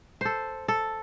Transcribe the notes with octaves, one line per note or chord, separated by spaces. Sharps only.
A4 C5
A4